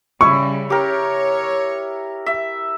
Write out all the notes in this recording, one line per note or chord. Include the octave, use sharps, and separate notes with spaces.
C#3 G3 E4 C#6
G4 A#4 C#5
E5